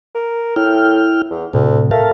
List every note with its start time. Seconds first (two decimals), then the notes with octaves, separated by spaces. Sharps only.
0.15 A#4
0.56 A2 E4 G5 F6
1.31 E2
1.53 D2 A2 C3
1.91 A3 A#4 F5 A5